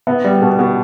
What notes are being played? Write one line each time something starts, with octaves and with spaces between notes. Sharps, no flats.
B3
G3
B2
B2